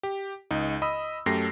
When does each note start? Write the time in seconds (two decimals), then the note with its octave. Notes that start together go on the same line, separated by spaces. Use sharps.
0.03 G4
0.51 C#2 D#4
0.82 D#5 B5 D#6 E6
1.26 F#2 A3 G4 A#6 C7